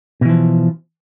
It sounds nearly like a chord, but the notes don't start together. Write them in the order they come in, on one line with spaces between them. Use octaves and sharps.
B2 E3 F3